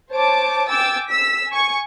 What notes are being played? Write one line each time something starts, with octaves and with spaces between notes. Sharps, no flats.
C5 C#5 A5 D6
G5 G#5 D6 E6 A6
E6 B6
G#5 C#6